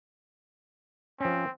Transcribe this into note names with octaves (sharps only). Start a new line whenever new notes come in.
F3 C4 C#4